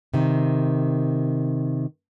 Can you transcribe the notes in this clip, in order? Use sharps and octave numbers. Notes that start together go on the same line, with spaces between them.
C3 D#3